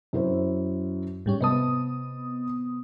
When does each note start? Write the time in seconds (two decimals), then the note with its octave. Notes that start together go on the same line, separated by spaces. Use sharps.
0.13 F#2 E4 C5
1.26 G#2 G3 C#4
1.40 C3 B3 D#5 A5 D#6